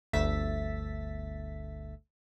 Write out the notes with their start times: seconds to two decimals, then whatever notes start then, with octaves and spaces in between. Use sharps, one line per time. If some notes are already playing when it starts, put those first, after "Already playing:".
0.13 G1 D2 A3 E5 A6 B6